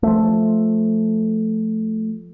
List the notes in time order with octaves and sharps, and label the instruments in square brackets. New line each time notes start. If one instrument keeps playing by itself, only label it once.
[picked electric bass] F3 A3